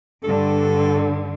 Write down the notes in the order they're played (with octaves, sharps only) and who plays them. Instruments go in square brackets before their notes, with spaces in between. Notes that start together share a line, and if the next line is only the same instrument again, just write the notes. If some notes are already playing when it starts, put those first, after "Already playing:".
[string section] G2 D3 [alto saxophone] A4